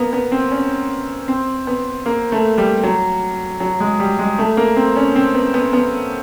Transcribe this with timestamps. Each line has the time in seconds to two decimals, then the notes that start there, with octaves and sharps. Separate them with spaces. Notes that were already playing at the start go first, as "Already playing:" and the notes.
Already playing: A#3 B3
0.13 B3
0.32 C4
0.51 C#4
1.28 C4
1.67 B3
2.06 A#3
2.32 A3
2.58 G3
2.83 F#3
3.60 F#3
3.80 G#3
4.00 G3
4.19 G#3
4.39 A3
4.57 A#3
4.76 C4
4.96 C#4
5.15 C4
5.35 B3
5.54 B3
5.73 B3